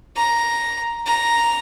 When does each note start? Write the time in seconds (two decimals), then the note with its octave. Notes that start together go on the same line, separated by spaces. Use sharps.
0.16 A#5
1.06 A#5